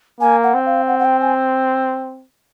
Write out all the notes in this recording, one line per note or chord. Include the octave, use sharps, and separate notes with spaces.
A#3 G#5
F#5
C4
F5
F#5
F#5
G5
G#5